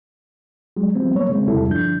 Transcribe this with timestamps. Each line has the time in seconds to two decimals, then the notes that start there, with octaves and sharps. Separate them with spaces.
0.76 F#3 G#3
0.95 F3 G3 B3 C4
1.12 F#3 A#3 C#5
1.29 C#3 G#3 C4
1.48 E2 C3 G3 E4 A4
1.67 G2 D3 F3 D4 G6